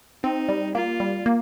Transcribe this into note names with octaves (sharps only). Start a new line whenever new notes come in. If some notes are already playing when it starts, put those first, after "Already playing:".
C4 D#4
G3
A#3 F4
G3
A#3